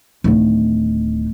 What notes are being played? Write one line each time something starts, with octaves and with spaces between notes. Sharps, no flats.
D1 D#3